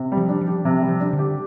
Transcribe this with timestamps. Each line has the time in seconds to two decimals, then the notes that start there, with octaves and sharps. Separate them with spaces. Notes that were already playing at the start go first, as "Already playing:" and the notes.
Already playing: C3
0.12 G3
0.17 F3
0.29 D4
0.41 F3
0.47 G4
0.65 C3 F3
0.82 G3
0.89 F3
1.00 D4
1.13 D3
1.19 G4